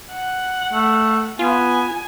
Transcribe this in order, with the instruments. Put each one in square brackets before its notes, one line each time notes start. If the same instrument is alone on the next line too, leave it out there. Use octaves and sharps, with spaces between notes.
[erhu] F#5
[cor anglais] A3
[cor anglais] B3 [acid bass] F4 [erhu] G#5